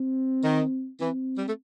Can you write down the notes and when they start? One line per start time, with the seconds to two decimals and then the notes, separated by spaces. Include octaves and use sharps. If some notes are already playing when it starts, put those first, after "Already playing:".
Already playing: C4
0.44 D#3
1.00 E3 C4
1.38 G3
1.47 A3